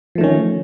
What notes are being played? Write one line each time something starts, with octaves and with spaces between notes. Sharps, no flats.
D#3 F3 A3 C#4